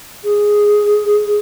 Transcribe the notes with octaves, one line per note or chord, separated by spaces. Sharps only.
G#4